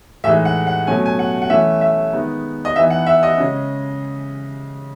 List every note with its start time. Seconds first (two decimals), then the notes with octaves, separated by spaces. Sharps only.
0.24 A2 E3 G#3 D#4 E5
0.45 F#5
0.67 F#5
0.87 B2 F#3 A3 C#4 G#5
1.06 G#5
1.19 F#5
1.42 F#5
1.50 E3 A3 C#4 E5
1.81 E5
2.13 D#3 G#3 B3 D#4
2.65 D#5
2.76 E3 B3 D#4 E5
2.90 F#5
3.07 E5
3.23 D#5
3.38 C#3 G#3 C#4